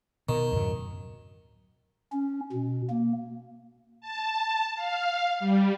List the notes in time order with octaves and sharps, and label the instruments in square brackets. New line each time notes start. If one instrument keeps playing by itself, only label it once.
[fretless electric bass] B2 [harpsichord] D#3
[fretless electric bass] D1 F#2 F#3
[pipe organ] C#4
B2
A#3
[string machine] A5
F5
G3